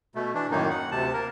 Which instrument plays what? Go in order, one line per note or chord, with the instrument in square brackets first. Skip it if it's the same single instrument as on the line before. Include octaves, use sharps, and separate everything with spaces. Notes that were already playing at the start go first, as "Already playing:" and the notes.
[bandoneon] B2 A3
E3 D4
F#2 A2 D#3 A#3 D#4
F#5
D2 C3 A5
A#3 A#4